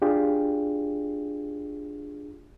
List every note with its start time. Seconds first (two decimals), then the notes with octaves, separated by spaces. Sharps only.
0.02 D4 F4 G4 G#4